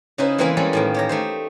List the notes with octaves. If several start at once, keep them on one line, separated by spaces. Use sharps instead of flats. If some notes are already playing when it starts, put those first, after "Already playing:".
C#3 C#4 D#4 E4 B4 C5
E3 G#3 A#3 C4 G#4 B4
G3 G#3 C#4 A4 B5
A2 D#3 A#3
G4 C#5 A#5
A3 D#4 C5